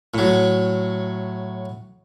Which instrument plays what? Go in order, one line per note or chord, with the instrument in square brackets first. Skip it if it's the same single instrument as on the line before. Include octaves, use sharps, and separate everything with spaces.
[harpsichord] A2 F#3